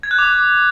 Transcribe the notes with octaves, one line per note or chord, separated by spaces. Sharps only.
G#6
F#6
D6